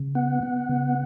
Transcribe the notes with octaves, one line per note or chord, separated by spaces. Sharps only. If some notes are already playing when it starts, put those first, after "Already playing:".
Already playing: C#3
B3 F#5
B3
C#3